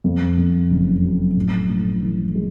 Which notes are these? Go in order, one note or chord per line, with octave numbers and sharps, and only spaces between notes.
F2
F2
F#1
F#3
A2
A2
E3
G#3